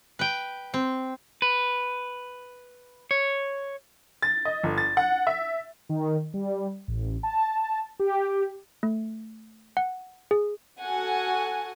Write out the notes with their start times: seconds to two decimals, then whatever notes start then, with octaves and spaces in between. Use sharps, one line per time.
0.19 B4 G5
0.74 C4
1.42 B4
3.11 C#5
4.22 A6
4.45 D#5
4.63 G1
4.78 A6
4.97 F#5
5.27 E5
5.89 D#3
6.34 G3
6.88 A1
7.23 A5
8.00 G4
8.83 A3
9.77 F#5
10.31 G#4
10.80 F#4 A4 F#5 G#5